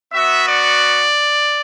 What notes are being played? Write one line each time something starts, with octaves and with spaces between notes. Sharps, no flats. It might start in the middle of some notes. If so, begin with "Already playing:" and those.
B3 F#4 E5
D5